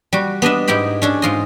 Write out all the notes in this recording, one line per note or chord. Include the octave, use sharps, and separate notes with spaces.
G3 F#4
B3 D4 D#5 E5
G#2 D#4 E4 G4 B5
C#4 D4 A4
G#2 F4 D#5